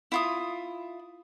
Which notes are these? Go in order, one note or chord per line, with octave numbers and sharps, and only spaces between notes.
E4 F4 D#6